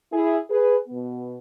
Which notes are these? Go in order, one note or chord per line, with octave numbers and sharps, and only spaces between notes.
E4 G#4
G#4 B4
B2 B3